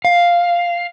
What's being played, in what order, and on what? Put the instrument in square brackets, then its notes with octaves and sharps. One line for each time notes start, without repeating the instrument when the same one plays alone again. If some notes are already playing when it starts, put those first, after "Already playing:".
[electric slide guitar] F5